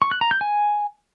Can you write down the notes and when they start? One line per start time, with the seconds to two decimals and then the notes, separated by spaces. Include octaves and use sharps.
0.02 C#6
0.11 F#6
0.21 A#5
0.31 G6
0.41 G#5